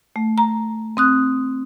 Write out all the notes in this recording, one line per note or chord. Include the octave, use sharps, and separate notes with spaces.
A3
A#5
C4 D#6 F#6